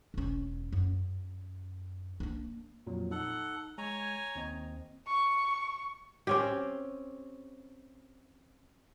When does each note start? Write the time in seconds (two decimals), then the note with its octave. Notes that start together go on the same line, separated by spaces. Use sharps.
0.14 E1 C#4
0.72 F#2
2.20 A#3 D4
2.86 F2 A#2 F#3
3.11 D#4 A4 F#5
3.78 G#3 C#5 G#5 A#5
4.35 D#2 C4 D#5
5.07 C#6
6.27 C4 C#4 G4